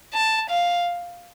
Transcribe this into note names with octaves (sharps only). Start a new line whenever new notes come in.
A5
F5